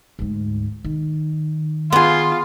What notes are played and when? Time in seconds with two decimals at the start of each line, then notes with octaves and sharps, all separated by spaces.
0.19 D2 G#2
0.84 D#3
1.92 B3 F4 G#4 C6